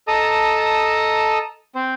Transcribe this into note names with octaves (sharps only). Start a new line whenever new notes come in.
A4 D#5 A5 A#5 D#6
C4 C5